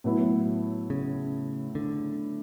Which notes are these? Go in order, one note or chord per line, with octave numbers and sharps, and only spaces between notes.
A2 F#3 B3 E4
C#3
D3